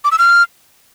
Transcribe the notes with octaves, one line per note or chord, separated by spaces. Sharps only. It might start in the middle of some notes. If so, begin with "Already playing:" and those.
D6
E6
F6